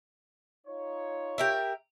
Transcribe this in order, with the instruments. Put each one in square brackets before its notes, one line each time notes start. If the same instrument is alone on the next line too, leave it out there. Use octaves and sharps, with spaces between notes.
[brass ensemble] D#4 F4 C#5
[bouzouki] G4 A#4 E5